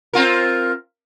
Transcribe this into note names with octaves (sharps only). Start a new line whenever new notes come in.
C4 F4 A#4